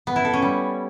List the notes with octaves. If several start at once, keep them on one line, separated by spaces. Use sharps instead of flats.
B3
E4
A4
C#4
G3